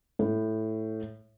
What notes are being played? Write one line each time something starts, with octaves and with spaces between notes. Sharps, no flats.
A2